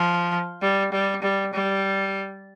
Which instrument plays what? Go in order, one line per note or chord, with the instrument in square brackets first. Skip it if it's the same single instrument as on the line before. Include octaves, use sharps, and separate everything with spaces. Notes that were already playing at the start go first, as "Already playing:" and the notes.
Already playing: [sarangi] F3
G3
G3
G3
G3